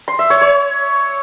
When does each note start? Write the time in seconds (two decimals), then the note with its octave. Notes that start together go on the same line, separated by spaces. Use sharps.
0.08 C6
0.19 E5
0.30 C#5
0.41 C#5